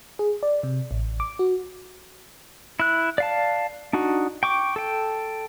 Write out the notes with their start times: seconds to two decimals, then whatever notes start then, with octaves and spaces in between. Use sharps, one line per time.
0.19 G#4
0.43 D5
0.63 C3
0.91 A1
1.20 D6
1.39 F#4
2.80 E4 F#6
3.18 D5 F5 A5
3.93 D4 D#4 F#4
4.43 G5 C#6 D6
4.76 A4 G5